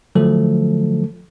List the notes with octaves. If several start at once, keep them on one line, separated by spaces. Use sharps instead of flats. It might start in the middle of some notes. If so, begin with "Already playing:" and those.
D3 F3 F#3 A3 A4